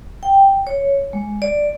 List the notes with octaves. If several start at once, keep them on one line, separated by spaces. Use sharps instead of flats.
G5
C#5
G#3
D5